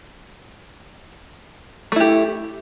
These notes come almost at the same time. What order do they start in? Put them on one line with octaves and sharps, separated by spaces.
A3 E4 G4